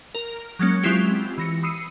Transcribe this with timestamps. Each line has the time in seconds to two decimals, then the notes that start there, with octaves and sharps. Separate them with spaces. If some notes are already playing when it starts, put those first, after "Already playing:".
0.15 A#4
0.59 F#3 G#3 A#3 C#4
0.83 F#3 G#3 C4 E4 F4 G4
1.38 E3 A#6 C#7
1.63 B5 D#6 E6 C7 C#7 D#7